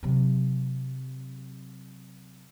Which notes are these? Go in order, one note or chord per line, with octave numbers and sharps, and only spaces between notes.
C3 F#3